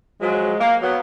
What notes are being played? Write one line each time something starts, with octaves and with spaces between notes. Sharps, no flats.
F3 F#3 G#3
A#3
F#3 B3